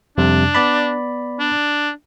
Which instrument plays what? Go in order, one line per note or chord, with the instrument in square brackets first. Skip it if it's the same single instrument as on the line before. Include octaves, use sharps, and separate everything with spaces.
[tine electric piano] F2 C3 G3 [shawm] D4
[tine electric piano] B3 D5 B5
[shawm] D4